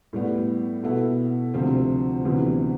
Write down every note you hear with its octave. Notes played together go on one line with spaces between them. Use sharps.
A2 G3 B3
B2 B3 E4 A4
D2 C3 F3 C4 F4
D2 C3 E3 B3